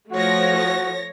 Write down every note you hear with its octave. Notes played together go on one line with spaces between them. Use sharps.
F3 A3 F#4 C#5 A#6